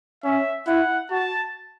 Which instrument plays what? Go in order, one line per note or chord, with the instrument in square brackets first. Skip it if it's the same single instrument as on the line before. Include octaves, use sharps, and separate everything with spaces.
[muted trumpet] C#4 [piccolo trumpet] E5
[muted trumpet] E4 [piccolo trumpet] F#5
[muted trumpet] F#4 [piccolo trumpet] A5